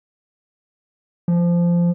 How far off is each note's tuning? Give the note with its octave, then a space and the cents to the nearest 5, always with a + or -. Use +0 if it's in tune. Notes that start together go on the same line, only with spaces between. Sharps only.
F3 -15